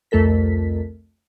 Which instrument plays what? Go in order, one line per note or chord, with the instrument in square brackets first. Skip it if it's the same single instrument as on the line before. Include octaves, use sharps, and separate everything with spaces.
[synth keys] C2 F2 A3 A4 A#4 B6